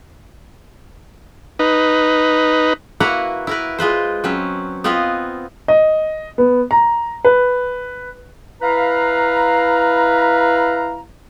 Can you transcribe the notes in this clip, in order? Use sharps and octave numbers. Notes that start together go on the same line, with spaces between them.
D#4 B4
A#3 E4 F#4 B4 F#5 A#5
E4 A#4 B4
G#3 F4 B4 C5
F#3 C4 C#4 B4
B3 C4 F4 B4 D#5 F5
D#5
B3
A#5
B4
E4 B4 F5 A#5